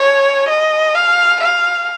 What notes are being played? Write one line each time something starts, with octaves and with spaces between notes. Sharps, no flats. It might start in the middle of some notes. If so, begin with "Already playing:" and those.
Already playing: C#5
D#5
F5
F5